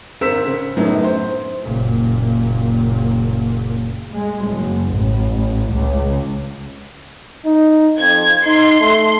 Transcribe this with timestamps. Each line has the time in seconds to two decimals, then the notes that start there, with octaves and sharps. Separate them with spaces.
0.21 G#1 A#4 C5 E6 B6 E7
0.45 C#3
0.77 F#2 A2 D#3 F#3 B3
1.04 C5
1.63 F#1 A#2
4.14 G#3
4.49 F#1
4.94 A1
5.73 C#2
7.45 D#4
7.98 F2 G#6
8.45 D#4 C6
8.80 A3